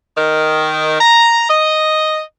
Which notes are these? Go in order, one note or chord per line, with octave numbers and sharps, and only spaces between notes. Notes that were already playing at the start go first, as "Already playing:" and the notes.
D#3
A#5
D#5